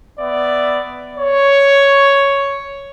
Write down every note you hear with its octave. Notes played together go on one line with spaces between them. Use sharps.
B3 D5 E5
C#5